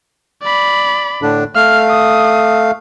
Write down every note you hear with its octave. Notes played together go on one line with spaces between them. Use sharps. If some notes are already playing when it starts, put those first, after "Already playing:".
D5 B5
A2 D3 D4
A3 F5 F6
D#6